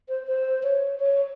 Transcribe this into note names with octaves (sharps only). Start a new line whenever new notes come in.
C5
C5
C#5
C#5